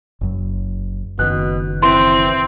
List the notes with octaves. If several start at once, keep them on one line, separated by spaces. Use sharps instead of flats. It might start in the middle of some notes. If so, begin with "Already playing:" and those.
F#1 F#2
F#1 B2 D#3 F#6
E3 C4 C6